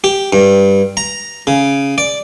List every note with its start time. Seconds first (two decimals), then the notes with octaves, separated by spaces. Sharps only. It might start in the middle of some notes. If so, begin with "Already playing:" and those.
0.04 G4
0.33 G2
0.97 A#5
1.47 C#3
1.98 D5